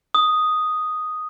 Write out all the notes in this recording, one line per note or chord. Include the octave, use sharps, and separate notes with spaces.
D#6